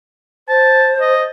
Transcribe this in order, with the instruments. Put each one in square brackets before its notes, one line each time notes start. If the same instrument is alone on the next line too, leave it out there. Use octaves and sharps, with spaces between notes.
[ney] C5 [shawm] A5
[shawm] D#5